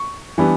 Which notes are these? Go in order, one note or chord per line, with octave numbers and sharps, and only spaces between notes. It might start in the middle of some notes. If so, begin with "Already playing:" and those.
Already playing: C#6
E3 G3 B3 D4